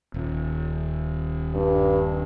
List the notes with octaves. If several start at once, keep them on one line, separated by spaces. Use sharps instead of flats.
D#1
G2